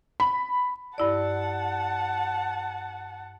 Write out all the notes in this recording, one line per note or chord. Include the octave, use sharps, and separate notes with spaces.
B5
G2 E4 D5 F#5 A5